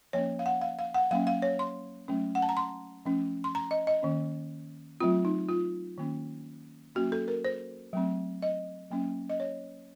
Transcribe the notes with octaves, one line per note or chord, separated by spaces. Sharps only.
F3 A#3 C#4 C#5
F5
F#5
F5
F5
F#5
F#3 A#3 C#4 F5
F5
C#5
C6
F#3 A3 C#4
F#5
A5
A#5
C6
F3 A3 C#4
C6
A#5
D#5
D#5
D#3 A#3 C#4
F#3 A3 C4 F4
D#4
F4
D#3 A#3 C#4
F#3 A#3 C#4 F#4
A4
A#4
C5
F#3 A3 C4
D#5
F#3 A#3 C#4
D#5
C#5